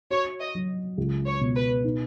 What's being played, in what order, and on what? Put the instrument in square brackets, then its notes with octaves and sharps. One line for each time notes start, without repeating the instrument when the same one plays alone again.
[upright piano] F#4 [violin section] C#5
[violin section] D#5
[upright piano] F#3
C#2
[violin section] C#5
[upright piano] B2
[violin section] B4
[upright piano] D#4